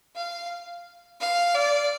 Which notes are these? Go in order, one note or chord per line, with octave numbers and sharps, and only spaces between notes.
F5
F5
D5